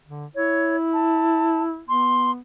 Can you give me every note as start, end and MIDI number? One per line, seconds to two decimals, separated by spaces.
0.08 0.26 50
0.35 1.81 64
0.35 0.76 73
0.94 1.63 81
1.89 2.39 59
1.89 2.31 84